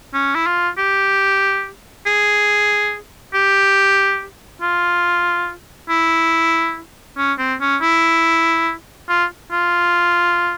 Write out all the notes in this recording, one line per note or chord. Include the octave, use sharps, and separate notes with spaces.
C#4
E4
F4
G4
G#4
G4
F4
E4
C#4
C4
C#4
E4
F4
F4